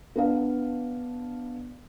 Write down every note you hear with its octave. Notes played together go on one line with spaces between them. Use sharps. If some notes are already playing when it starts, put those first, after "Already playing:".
B3 D4 F5